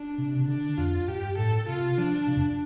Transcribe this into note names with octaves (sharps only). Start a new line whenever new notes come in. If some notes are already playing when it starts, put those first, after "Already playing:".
Already playing: D4
C3
C3
D3 D4
F2 F4
G2 G4
A2 A4
C3 F4
F3 D4
C3
F2